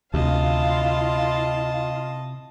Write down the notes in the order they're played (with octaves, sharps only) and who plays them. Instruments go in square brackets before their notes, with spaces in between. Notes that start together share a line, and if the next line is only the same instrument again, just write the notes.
[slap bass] D2 [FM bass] C3 [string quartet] E4 F4 F5 [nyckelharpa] D#5 A5